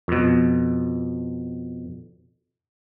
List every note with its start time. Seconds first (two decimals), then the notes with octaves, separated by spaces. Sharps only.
0.08 F2 B2